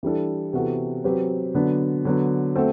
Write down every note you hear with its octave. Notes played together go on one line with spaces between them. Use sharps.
E3 G3 D4 A4
C3 E3 B3 F#4 A4
F#3 C4 G4 B4
D3 F#3 B3 D4
D3 F#3 B3
A3 C4 F#4 A4